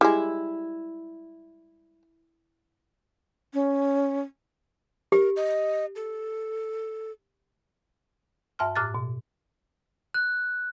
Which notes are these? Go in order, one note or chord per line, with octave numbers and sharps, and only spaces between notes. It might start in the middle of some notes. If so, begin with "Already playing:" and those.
G3 G#3 E4
C#4
G4 A#4
D#5
A4
G2 E5 A5 C6 F6
A2 D6 F6 F#6 A6
B2
F#6